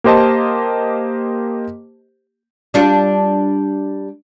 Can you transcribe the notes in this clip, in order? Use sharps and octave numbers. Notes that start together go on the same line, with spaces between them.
A#3 G4 C5 D#5 A5
G3 D4 F4